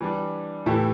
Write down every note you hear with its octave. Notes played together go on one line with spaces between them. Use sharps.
E3 G3 D4
A2 E3 A3 E4 G4